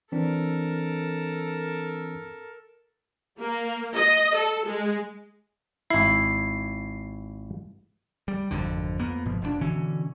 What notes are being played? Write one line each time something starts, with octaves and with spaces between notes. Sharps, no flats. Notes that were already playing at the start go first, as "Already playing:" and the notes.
E3 C4 D4 A4 A#4
A#3
D#5
A4
G#3
G#1 E4 C7
G3
G#1 F2 D3
F2 A#3 B3
G1 G#2 B2 F3
F1 G#2 D4
B2 D3 E3 C#4